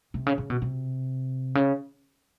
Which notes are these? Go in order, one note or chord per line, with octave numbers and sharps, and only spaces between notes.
C3
C#3
C#3
B2
C3
C#3